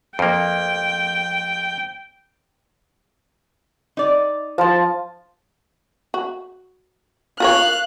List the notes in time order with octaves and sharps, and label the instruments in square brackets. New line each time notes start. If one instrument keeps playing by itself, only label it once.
[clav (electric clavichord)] F2 A#3 [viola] G5
[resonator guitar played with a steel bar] D#4 D5
[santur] F3 A5 [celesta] C5 C6
[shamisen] F#4
[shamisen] F4 A#4 C#5 [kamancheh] F5 F#6